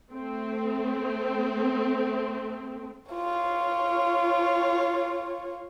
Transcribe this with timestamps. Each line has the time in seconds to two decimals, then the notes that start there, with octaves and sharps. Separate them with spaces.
0.12 A3 C4
3.12 F4 C#5